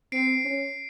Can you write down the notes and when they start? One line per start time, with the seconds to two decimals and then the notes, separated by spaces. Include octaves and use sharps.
0.12 C4 C7 D7
0.44 C#4